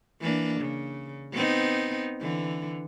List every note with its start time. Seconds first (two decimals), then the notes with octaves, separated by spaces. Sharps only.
0.21 E3 A#3 D4
0.61 C#3
1.33 B3 C4 D#4
2.21 D3 E3